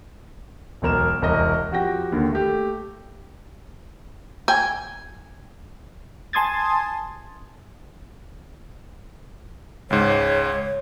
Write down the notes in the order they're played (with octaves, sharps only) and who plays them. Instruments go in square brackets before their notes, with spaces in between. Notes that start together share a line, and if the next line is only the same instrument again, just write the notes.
[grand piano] E1 B1 A#4 E7
E1 C2 A#4 D#5 A#6
F2 F#4 G4 G5 A#6
D#2 D3
A3 G4
[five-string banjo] G5 G#5
[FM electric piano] G#5 A5 C6 D#6 G#6 A6
[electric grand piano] C#2 G#2 [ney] C#5